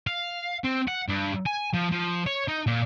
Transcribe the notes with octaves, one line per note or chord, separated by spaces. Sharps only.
F5
C4
F#5
G2
G#5
F3
F3
C#5
D#4
A#2